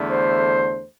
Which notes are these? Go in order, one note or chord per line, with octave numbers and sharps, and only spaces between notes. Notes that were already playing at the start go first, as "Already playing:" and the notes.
Already playing: E2 D3 A3
C5